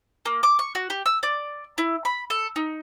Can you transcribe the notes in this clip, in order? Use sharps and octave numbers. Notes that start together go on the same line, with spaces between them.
A#3
D6
C#6
F#4
G4
E6
D5
E4
B5
A4
D#4